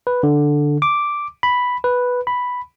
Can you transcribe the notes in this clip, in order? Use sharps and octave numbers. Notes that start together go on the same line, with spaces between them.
B4
D3
D6
B5
B4
B5